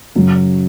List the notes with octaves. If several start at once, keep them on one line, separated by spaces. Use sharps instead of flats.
F#2 C#3 F#3